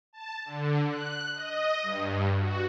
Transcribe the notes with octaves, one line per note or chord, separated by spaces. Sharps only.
A5
D3
F#6
D#5
G2
F#4